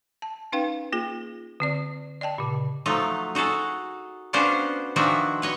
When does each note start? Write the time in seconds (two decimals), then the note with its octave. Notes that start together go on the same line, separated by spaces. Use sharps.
0.22 A5
0.52 C#4 D#4 B4 F5 G5
0.92 A#3 F4 G#4
1.60 D3 C4 D5
2.21 D5 D#5 G5 A5
2.38 A#2 C#3
2.86 F3 F#3 A3 D#4
3.35 D#4 F#4 G#4 A4
4.33 B3 C#4 D4 F4 F#4 C5
4.96 D#3 F3 D4 F#4 E5 G#5
5.42 B4 C#5 D#5